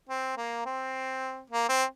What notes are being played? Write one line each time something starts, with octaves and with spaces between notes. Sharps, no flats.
C4
A#3
C4
A#3
C4